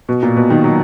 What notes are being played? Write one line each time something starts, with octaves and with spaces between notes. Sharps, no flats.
B2
A#2
B2
D#3
F#3